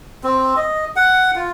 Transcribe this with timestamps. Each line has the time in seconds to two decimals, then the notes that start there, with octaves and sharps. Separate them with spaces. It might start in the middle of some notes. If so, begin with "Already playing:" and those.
0.24 C4
0.57 D#5
0.96 F#5
1.36 F4